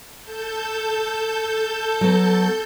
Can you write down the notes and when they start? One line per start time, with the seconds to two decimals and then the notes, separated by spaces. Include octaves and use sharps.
0.22 A4 A5 G6
2.01 F#3 B3